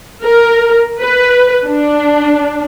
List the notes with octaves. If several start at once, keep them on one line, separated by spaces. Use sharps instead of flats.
A#4
B4
D4